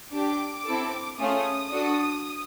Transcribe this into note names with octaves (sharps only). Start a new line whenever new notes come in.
D4 G4 D6
C4 E4 A4
A3 C#4 F4 G#4 D#6
D4 F#4 A4